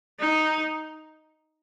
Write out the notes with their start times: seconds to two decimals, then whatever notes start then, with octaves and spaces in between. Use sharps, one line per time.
0.20 D#4